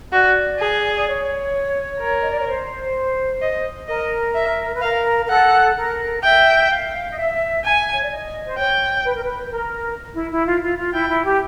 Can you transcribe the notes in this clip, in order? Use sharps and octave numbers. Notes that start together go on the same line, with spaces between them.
F#4 D5
G#4
D5
C#5
A#4
D#5
D5
C#5
C5
D#5
A#4 D#5
E5
B4
A#4 F5
A#4
A4 F#5
A#4
E5 G5
F5
D#5
E5
G#5
C#5
D5
D#5
C5
C#5 G5
B4
A#4
B4
B4
A#4
E4
E4
F4
F4
F4
E4 G5
E4
G4